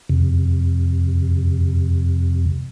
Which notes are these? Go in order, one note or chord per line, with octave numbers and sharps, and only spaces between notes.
F2 C3